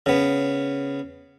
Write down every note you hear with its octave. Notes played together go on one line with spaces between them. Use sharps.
C#3 B3